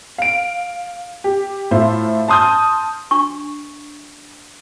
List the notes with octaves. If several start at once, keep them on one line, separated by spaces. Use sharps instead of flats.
F5 D7
G4
A2 F4 C5 E5
A5 C6 D#6 F6 G6
D4 C#6